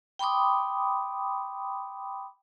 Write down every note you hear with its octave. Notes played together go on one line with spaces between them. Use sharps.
G5 B5 C6 D6 D#6